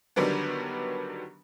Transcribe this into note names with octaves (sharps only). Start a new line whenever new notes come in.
D3 D#3 F#3 G3 B3 D4